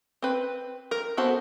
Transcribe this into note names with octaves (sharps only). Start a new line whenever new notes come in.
C4 B4
A#4
B3 F#4 A4 C5